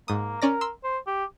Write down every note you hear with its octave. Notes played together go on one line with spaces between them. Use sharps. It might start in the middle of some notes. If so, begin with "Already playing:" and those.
G#2 A#3 D#6
C#4 A#4 D5 A#6
C6 E6
C5
G4